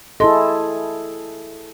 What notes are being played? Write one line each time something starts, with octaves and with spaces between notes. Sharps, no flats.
E4 G#4 A4 D#5 C6